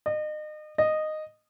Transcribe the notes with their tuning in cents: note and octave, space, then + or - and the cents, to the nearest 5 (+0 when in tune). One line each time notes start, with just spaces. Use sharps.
D#5 -35
D#5 -10